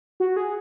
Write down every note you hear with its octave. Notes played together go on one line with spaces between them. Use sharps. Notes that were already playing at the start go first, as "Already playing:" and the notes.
F#4
G#4